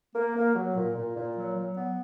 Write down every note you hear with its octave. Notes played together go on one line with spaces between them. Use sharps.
A#3
A#3
F#3
A#2
A#2
A#2
F#3
F#3
B3